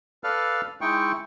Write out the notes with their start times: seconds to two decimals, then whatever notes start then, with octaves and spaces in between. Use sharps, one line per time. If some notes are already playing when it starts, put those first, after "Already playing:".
0.24 A4 B4 D5 F5 F6
0.81 G#3 D#4 E4 G5 C#6